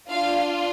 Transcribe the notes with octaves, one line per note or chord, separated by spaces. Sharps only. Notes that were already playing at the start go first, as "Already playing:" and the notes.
D4 F4 F5